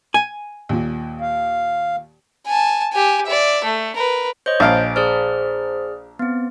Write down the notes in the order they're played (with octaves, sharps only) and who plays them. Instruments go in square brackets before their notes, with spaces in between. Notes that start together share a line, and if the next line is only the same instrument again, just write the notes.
[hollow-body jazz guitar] G#5
[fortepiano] D#2 A#2
[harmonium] F5
[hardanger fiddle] G#5 A5
G4 G#5
D5 E5
A3
A#4 B4
[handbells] C5 C#5 D#5 [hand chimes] G6
[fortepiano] A#1 F5 [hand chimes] G#5 [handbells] A6 D7
[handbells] G#4 D5 F6 [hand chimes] C5
[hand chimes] B3 C4